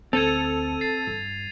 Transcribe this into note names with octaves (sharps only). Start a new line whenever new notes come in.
D2 C4 A4 G#6 D#7 F7
A6 C7
G2